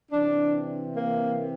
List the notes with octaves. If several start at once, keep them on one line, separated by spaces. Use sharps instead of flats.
C3 E3 D4
A#3